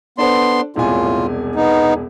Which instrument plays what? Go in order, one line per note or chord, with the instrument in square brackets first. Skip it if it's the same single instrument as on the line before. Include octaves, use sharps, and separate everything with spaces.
[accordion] B3 C6 [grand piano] D4 A4 C5
[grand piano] E1 C2 G#5 [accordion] A2 F4
[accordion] B3 D#4